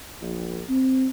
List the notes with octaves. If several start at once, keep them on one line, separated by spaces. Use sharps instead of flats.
A#1
C4